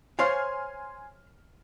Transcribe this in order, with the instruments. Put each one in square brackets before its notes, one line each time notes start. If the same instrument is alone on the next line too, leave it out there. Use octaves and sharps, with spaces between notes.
[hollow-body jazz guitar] C5 C#5 F5 [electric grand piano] G#5 C6 F6